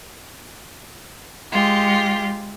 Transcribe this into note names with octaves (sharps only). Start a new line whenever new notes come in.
G#3 F4 G4